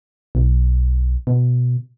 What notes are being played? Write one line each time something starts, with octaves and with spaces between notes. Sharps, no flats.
B1
B2